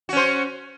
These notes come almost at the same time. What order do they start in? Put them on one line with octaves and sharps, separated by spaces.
F#4 C#4 C5